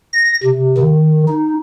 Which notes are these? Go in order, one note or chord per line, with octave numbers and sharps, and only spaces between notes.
A#6
C3
D#3
D#4